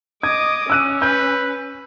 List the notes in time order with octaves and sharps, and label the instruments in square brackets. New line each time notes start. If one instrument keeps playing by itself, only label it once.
[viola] D#5 D6 [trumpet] D#6 [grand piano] G#6
[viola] C#4 [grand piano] E6 F#6 D#7
[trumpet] B4 [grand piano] G6